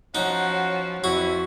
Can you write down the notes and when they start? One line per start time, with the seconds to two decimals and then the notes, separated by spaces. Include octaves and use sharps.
0.15 F3 C#4 D#4 F#4 C#5 F#5
1.04 F2 E4 F#4